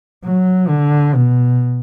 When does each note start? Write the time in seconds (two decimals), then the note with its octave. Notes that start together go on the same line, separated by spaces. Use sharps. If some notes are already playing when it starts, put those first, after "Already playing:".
0.24 F#3
0.68 D3
1.15 B2